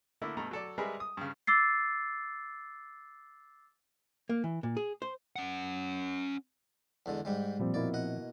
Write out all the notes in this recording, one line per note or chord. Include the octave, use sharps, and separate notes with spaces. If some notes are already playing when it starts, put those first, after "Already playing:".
D3 A3 A#3 E4
G2 B2 A3 A#5
F#3 A4 D5
G3 G#3 G#4 A#4 B4 E5
D#6
G2 C#3
D6 E6 A6 C7
A#3
E3
A#2
G#4
C5
C#4 F#5
E2 D3 G#3
G#2 G3 G#3
A#2 F3 G3 C4
B2 A#3 E4 D5
D#5 F#5